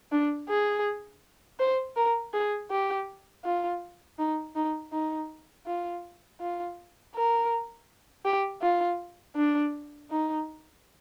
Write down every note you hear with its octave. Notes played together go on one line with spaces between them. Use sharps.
D4
G#4
C5
A#4
G#4
G4
F4
D#4
D#4
D#4
F4
F4
A#4
G4
F4
D4
D#4